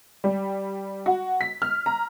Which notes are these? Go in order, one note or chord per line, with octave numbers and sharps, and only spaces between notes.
G3
F#4
B6
F6
A#5